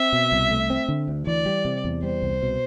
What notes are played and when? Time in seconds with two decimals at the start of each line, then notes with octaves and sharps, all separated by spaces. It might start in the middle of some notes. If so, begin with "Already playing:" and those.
Already playing: C4 E5
0.13 B2
0.32 C2
0.51 A3
0.70 C4
0.88 D3
1.08 D2
1.27 E3 D5
1.46 G3
1.65 C3
1.84 E2
2.03 G3 C5
2.22 C2
2.42 B2